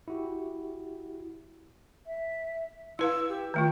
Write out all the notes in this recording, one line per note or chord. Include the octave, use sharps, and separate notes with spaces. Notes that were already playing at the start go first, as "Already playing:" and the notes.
E4 F#4 G4
E5
E4 B4 F5 E6
G4
D#3 A3 F4 G5